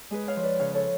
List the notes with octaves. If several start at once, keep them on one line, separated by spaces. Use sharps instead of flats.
G#3 G#4 B4
C#5 F5
F3
B4 D5
C#3 C#5 F5
A4 C#5